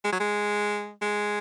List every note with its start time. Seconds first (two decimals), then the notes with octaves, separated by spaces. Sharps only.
0.04 G#3
0.12 F#3
0.20 G#3
1.02 G#3